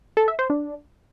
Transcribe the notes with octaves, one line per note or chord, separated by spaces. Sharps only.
A4
E5
C5
D4